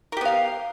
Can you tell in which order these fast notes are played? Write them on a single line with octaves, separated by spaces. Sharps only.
A#4 G4 B3 F5